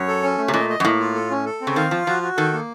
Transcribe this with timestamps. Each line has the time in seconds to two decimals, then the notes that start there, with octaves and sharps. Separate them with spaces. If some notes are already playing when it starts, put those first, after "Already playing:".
Already playing: F#2 C#5
0.08 A4
0.23 C#4
0.38 A3
0.48 C3
0.53 A#2 D#5
0.69 D#5
0.80 F#2
0.85 A2 A#3
0.99 F4
1.15 A4
1.31 C#4
1.45 A4
1.61 C4
1.67 C#3
1.76 D#3 F5
1.91 F3 F4
2.07 F3 F#4
2.23 F#4
2.37 D#3 A4
2.53 A#3